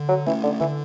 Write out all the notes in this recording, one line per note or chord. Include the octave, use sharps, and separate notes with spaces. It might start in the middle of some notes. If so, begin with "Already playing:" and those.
Already playing: D3
F#3
E3 A3 C#4
D3
D3 E3